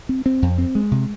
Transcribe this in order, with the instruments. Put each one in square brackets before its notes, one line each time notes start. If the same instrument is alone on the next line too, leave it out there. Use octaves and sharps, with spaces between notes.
[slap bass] C4
C4
F2
C4
G#3
C3